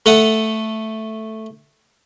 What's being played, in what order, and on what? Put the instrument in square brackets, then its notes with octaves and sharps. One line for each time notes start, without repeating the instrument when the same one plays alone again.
[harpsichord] A3 A4 F#5 D#6